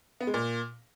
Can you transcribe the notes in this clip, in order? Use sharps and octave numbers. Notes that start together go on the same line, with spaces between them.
B3
G#3
A#2